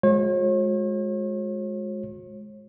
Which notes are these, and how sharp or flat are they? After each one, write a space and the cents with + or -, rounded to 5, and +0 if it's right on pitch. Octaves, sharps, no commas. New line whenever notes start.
G#3 +10 F#4 -40 C#5 -40